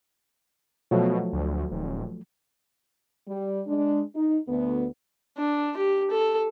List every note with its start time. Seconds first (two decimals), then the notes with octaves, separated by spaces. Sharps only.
0.91 B2 F3 F#3 A3
1.33 D2
1.71 D#1
3.27 G3
3.66 G#3 D4
4.15 D#4
4.48 D2 B3
5.38 D4
5.77 G4
6.11 A4